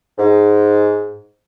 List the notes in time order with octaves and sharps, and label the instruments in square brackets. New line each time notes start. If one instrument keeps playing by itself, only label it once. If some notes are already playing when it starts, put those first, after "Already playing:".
[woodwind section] G#2